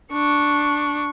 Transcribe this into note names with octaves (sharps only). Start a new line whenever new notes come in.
D4 C#6